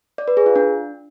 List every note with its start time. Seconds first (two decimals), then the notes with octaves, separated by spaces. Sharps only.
0.18 D5
0.28 B4
0.37 G#4
0.46 F4
0.56 D4